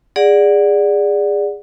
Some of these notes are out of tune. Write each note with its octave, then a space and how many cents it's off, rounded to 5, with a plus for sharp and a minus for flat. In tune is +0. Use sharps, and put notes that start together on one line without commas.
G#4 -20 D5 +0 F#5 -5